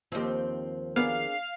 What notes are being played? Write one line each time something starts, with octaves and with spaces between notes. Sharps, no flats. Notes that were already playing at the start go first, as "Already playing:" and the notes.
D#2 F3 C4 D#4 G4
B3 D4 G#4 A#4 F5